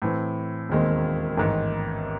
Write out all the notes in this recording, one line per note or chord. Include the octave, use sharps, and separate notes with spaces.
A2 E3 C4
E1 D#2 D#3 G#3 C4
A1 G#2 D#3